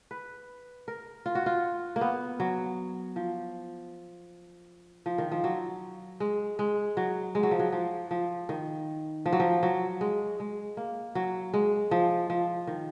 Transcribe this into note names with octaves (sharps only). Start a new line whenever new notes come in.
B4
A#4
F4
F#4
F4
A#3
B3
F#3
F3
F3
D#3
F3
F#3
G#3
G#3
F#3
G#3
F#3
F3
F#3
F3
F3
D#3
F3
F#3
F3
F#3
G#3
G#3
A#3
F#3
G#3
F3
F3
D#3